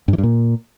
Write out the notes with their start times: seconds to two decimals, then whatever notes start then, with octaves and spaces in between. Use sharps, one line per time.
0.08 G2
0.13 E3
0.18 G2
0.23 A#2